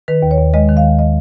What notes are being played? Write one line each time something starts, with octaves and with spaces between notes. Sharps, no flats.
D#3 B4
D#2
C#5
D#2
G#3 D#5
D#3
F5
D#2
D#5